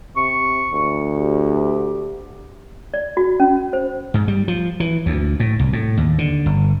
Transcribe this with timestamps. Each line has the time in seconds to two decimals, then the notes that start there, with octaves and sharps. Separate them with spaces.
0.16 C3 C#6
0.73 D2
1.14 G4
2.94 D5
3.17 F#4
3.40 C#4
3.73 C5
4.14 G#2
4.28 G3
4.48 F3
4.80 E3
5.06 D2
5.40 A2
5.60 C2
5.73 A2
5.97 D#2
6.18 D3
6.46 G1